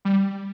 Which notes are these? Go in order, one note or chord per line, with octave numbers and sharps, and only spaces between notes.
G3